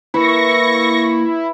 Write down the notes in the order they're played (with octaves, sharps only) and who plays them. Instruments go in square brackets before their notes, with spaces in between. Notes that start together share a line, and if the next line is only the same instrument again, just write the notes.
[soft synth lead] A#3 [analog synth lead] E4 [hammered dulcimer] B4 [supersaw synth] C#6 A#6